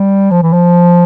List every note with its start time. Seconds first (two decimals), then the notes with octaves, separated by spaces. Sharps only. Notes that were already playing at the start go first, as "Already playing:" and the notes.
Already playing: G3
0.31 F3
0.43 E3
0.53 F3